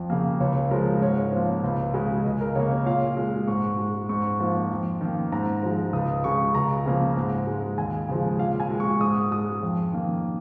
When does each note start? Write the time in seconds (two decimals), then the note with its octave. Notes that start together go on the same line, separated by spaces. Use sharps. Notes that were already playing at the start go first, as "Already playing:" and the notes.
Already playing: F2
0.10 C#3 A#3
0.40 C#2 C#5
0.71 C#3 F3 G#3 A#4
1.01 G#2 C#5
1.32 F3 A#3
1.64 C#2
1.94 C#3 G#3
2.25 C#2 D#5
2.41 A#4
2.55 C#3 A#3 C#5
2.71 C#5
2.86 A#2 F5
3.17 G#3
3.47 G#2 C#6
3.78 G#3
4.09 G#2 C#6
4.40 F3 A#3
4.71 F2
5.01 D#3 A#3
5.32 G#2 A#5
5.63 F3 G#3
5.93 C#2 D#6
6.24 C#3 G#3 C#6
6.55 C#2 A#5
6.86 C#3 F3 A#3
7.17 G#2
7.47 G#3
7.78 D#2 G#5
8.08 C#3 F3 G#3
8.39 A#2 F5
8.60 G#5
8.70 G#3
8.80 C#6
9.01 G#2 D#6
9.32 G#3 D#6
9.63 F2
9.93 D#3 A#3